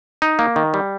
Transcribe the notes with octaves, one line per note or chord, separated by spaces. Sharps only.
D#4
A#3
D#3
G3